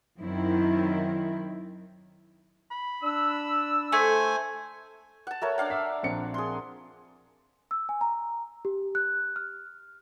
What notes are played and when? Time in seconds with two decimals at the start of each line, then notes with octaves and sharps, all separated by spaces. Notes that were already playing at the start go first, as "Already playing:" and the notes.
0.20 F#2 D#3 C4 E4
2.71 B5
3.03 D4 E6
3.92 A3 C5 G#5
5.27 F#5 A5
5.41 A3 A#4 C#5
5.58 D4 F5 F#5
5.70 E5
6.03 A#1 C4 C#7
6.34 G#4 C6
7.71 E6
7.89 G#5
8.01 A#5
8.65 G4
8.95 F#6
9.36 F6